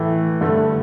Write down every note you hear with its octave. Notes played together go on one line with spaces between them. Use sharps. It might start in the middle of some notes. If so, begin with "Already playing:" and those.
Already playing: A2 E3 A3
G2 D3 A3